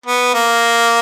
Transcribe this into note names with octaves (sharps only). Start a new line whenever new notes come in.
B3
A#3